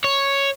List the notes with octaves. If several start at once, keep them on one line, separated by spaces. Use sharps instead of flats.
C#5